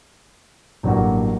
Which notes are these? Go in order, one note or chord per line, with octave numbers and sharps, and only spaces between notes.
A1 G2 F#3 A#3 F#4